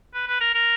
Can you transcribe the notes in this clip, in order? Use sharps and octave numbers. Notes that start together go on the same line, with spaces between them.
B4
B4
A#4
A#4